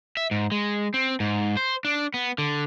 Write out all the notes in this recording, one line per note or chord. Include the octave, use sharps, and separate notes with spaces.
E5
G#2
G#3
C4
G#2
C5
D4
B3
D3